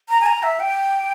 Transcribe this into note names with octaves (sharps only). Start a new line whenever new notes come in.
A#5
G#5
A#5
E5
G5